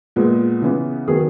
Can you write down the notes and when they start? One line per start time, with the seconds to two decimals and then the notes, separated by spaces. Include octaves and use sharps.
0.16 A#2 G#3 B3
0.62 C#3 E3 B3
1.08 D#3 F#3 B3 G#4